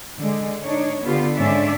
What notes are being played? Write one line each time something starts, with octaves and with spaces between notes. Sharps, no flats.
D3 G#3
D4 D#4 C#5
D3 B3 F4 G4
G#2 D3 C#4 D4 D5 E5